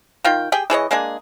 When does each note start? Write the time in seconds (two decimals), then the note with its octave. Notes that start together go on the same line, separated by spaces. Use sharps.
0.25 D#3 F4 F5 G5
0.52 G4 G#4 G5
0.70 E3 G#4 C#5 D#5
0.91 G#3 A#3 D4 G#4